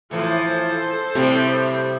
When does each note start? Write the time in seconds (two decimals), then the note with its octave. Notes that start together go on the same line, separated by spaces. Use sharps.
0.11 A2 E3 F3 A4 C5
1.15 A2 C3 G3 A3